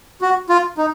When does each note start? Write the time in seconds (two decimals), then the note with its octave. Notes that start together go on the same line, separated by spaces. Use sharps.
0.22 F#4
0.49 F4
0.78 D#4